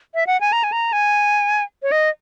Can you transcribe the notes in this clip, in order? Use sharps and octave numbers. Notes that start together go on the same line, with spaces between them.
E5
F#5
G#5
A#5
G#5
A#5
G#5
C#5
D#5